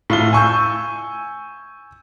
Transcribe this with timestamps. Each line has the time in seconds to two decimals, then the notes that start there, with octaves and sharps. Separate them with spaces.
0.10 A2 F4 G7
0.33 G#5 C#6 E6 G6